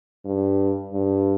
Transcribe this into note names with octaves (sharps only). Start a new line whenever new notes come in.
G2
G2